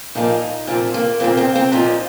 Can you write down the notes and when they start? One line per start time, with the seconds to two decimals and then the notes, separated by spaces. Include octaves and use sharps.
0.15 A#2 F3 A#3 D#4
0.67 A#2 F3 A#3 C4
0.94 A#3
1.20 A#2 F3 A#3 C4
1.37 C4
1.55 C4
1.72 A#2 F3 A#3 D#4